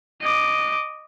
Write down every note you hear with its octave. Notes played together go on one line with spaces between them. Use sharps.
D#5 D6